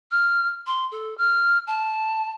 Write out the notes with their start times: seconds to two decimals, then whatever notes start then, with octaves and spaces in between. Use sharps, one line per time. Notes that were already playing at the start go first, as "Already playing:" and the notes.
0.11 F6
0.67 C6
0.92 A4
1.18 F6
1.67 A5